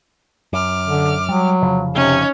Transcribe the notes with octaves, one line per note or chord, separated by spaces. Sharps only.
F#2 D6 F6
D3
F#3 G3
F1 C#3 F3
C3 C#4 D#4 C#5